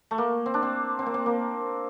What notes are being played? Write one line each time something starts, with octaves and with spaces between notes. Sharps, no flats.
A3
A#3
C4
D4
C4
C4
A#3
C4
A#3